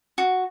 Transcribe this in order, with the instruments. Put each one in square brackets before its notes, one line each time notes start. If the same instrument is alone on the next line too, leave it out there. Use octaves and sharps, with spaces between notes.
[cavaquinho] F#4